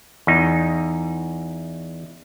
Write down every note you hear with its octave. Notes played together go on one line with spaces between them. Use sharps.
E2 D#4